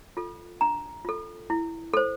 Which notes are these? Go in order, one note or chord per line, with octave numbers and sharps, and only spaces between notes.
F4 A4
D4 A#5
F4 A4
E4
A4 C5